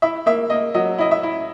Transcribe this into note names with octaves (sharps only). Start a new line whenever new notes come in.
E4 E5
A#3 E5
A#3 D#5
F#3 D#5
E4 D#5
E5
E4